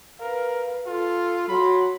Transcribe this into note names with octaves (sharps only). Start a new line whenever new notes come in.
A#4 B4 F5
F4 A4
F#3 B5 C6